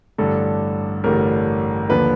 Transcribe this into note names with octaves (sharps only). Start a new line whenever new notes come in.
A1 G2 D3 G3 A4
A1 G2 D3 G3 A#4
D#2 D3 F3 B4